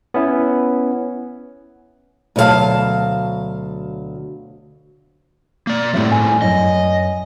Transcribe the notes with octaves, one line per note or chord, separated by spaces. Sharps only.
B3 C#4 E4
D2 B2 F#3 F4 F5 A5
A#3 D5
A2 F3 C4 E4 D5 E5
G#5
F#2 D#5